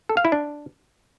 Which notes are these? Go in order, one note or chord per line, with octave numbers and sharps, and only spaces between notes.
A4
F5
E4
D4